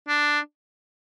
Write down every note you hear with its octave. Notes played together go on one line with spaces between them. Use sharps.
D4